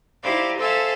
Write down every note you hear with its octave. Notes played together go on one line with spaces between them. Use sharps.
D#4 E4 G4 C5 D5 F5
A4 C5 E5 F5 G#5 A5